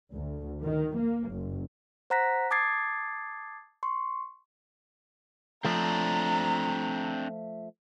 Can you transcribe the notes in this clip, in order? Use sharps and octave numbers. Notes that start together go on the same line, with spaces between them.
D2
D#3
A#3
F#1
C5 F#5 A#5 F#6 A#6 B6
A5 D6 D#6 G#6 A6 C7
C6 C#6
F3 A3 C4 D4 A#5